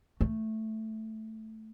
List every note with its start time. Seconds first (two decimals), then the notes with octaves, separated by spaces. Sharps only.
0.21 A3